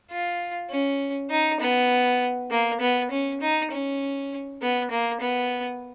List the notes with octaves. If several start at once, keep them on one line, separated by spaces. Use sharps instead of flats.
F4
C#4
D#4
B3
A#3
B3
C#4
D#4
C#4
B3
A#3
B3